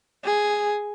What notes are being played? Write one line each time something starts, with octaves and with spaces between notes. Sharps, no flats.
G#4